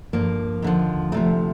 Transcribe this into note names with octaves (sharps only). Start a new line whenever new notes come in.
G2 F3 A#3
D#2 D3 F3
D2 C3 F3 A3